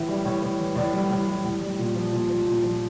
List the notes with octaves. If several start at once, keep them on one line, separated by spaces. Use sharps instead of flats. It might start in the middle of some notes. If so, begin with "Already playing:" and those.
Already playing: A2 E3 E5
G3
A2 C#5
A2
E3
A2 D5
G3
A2
G3
A2
G3
A#2
F3
A#2
F3
A#2
F3